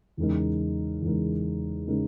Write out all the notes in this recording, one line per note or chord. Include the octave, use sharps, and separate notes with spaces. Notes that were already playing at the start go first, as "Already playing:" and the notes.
E2 C#3 G#3 D#4 A#4
E2 C#3 G#3 D#4 A#4
C#3 G#3 D#4 A#4